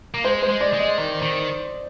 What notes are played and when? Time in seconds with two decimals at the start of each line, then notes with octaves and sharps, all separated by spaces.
0.14 A#3
0.24 G#3 C5
0.43 C5
0.49 G#3
0.61 D5
0.73 G#3
0.79 D#5
0.98 D#3
1.22 D#3